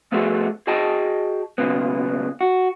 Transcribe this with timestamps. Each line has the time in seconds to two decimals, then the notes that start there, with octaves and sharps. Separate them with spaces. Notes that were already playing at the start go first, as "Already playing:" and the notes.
0.12 F3 A3 B3 F#4 G#4 A4
0.67 F#4 G#4 D#5 G5 A5
1.58 B1 E2 A#2 C#3 B3
2.41 F#4